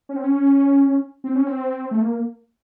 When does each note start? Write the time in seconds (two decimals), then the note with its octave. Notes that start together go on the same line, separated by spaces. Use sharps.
0.09 C#4
0.16 C4
0.24 C#4
1.24 C4
1.35 C#4
1.47 C4
1.91 A3
2.01 A#3